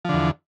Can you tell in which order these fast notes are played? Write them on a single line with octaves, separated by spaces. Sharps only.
F3 D3 E2